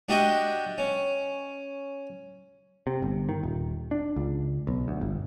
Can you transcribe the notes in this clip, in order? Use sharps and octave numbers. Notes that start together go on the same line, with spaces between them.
D4 F#4 G4 D#5 E5 G5
C#4
C3
G1
D#3
D#1
D4
C#2
B1
D2
G1